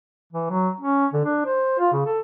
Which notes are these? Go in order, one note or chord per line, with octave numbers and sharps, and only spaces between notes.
E3
F#3
C#4
D3
D4
C5
F4
C#3
A4